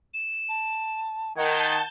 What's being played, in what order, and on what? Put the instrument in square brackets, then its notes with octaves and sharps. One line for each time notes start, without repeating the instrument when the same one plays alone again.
[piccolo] E7
[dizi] A5
[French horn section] D#3 [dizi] F#5 [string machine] A5 G6 [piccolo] G#6